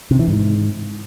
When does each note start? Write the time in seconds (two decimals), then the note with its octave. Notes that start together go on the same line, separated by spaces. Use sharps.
0.11 C3
0.19 E3
0.28 G#2